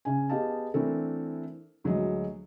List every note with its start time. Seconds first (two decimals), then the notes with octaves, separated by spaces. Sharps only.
0.05 C#3 G#5
0.29 B3 G4 G#4 D#5 F5 A5
0.74 E3 A3 C4 D4 A4 A#4
1.84 D2 F#3 G#3 G#4 D#5